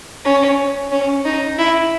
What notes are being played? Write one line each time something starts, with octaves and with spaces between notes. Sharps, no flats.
C#4
C#4
D#4
E4